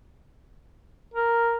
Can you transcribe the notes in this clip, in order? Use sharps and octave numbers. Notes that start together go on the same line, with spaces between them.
A#4